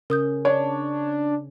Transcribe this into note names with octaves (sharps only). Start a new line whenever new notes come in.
C#3 C#4 A#4 D#6 G6
D4 C#5